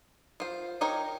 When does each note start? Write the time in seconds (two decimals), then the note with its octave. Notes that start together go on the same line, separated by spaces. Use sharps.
0.40 F4 C5
0.81 D#4 G4 A#4 C#5